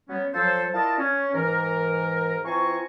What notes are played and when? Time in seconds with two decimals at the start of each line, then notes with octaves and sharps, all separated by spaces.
0.09 F#3 G3 B3 C#4
0.34 F3 F#3 A4 C5
0.74 E4 F4 A#4 D5 D#5 A5
0.98 C#4
1.34 G#2 E3 A#4
2.45 E3 C4 F4 G#5 A#5 C#6